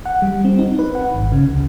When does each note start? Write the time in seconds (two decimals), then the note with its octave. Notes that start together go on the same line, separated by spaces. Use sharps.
0.06 F#5
0.22 G3
0.45 C4
0.59 D#4
0.79 B4
0.95 F#5
1.14 G#1
1.32 C#3
1.50 C#2